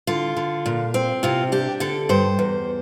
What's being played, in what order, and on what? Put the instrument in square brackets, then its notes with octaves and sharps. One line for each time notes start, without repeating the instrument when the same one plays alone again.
[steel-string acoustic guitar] D3 F4
D3
A#2
C4
C3 F4
D4 G4
D3 A4
G2 C5
E2